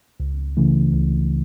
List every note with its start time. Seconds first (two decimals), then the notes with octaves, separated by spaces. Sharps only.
0.20 C#2
0.57 C#3 E3 A3
0.94 C#2